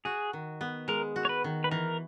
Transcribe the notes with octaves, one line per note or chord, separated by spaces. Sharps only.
F#4 G#4
D#3
B3
G#3 A#4
F#4
C#5
B4
D#3
B4
E3 A#4